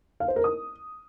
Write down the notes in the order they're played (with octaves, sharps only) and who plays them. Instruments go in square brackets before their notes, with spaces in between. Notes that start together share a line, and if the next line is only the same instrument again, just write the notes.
[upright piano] F5
C5
A#4
D#6